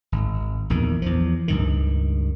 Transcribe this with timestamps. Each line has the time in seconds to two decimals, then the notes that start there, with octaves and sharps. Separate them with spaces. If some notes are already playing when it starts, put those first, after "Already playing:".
0.12 G#1
0.70 A#1 E2 D#3
1.02 E2 F3
1.48 C#2 G2 D#3